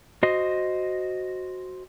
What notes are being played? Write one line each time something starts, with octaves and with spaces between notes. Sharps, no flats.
F#4 C5 D#5